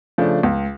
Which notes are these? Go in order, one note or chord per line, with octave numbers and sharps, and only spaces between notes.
C#3 F3 A3 D4
C#2